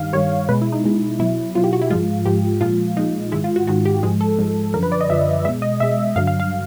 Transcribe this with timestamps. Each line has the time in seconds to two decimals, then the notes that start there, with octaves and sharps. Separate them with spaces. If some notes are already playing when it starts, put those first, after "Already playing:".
Already playing: G2 D#3 G3 F5
0.13 G2 D#3 G3 C#5
0.49 B2 G#3 B4
0.62 E4
0.72 D#4
0.84 B2 G#3
1.19 B2 F#3 E4
1.55 B2 F#3 F4
1.64 G4
1.73 F#4
1.81 E4
1.90 G#2 F3 G#3 F4
2.26 G#2 F3 G#3 G4
2.61 A#2 F3 G#3 F4
2.97 A#2 F3 G#3 D#4
3.32 G#2 D#3 G#3 E4
3.44 F4
3.56 F#4
3.67 G#2 D#3 G#3 F#4
3.85 G4
4.03 G#2 F3 G#3 G#4
4.21 A4
4.39 G#2 F3 G#3
4.74 F#2 D3 F3 A#4
4.83 B4
4.92 D5
5.01 D#5
5.09 F#2 D3 F3 E5
5.45 B2 G#3 E5
5.62 D#5
5.80 B2 G#3 E5
6.16 G2 D3 F#3 F5
6.27 F5
6.40 F5